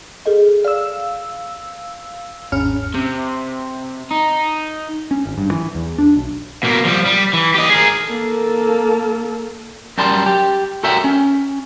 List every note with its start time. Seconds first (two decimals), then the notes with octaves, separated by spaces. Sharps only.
0.26 G#4 A4 D#5
0.64 D5 F5 E6
2.52 G#1 E2 C#4 F6
2.94 C3
4.11 D#4
5.11 C#4
5.25 G#1
5.38 G2
5.51 E3
5.75 E2
5.98 D4
6.16 B1
6.63 B2 A#3
6.85 F3 G3
7.06 G3
7.33 E3
7.54 G4 D#5
7.69 G#4 A#4
8.07 A#3 A4
9.98 F#2 G3 A#4 A5 C6
10.26 G4
10.83 F#4 A4 A#4 C#5 E5 G5
11.04 C#4